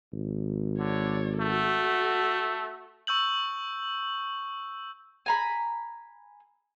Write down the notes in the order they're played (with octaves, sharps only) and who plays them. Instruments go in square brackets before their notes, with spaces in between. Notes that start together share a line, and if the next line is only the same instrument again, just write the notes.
[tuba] G#1
[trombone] D3 [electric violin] C#5 D5
[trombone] A3 [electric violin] F#4 A4
[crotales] C#6 E6 G6 F#7
[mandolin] G#5 A#5 B5